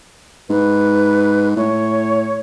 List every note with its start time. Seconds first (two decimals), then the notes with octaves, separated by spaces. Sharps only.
0.50 G#2 B4
1.57 A2 C#5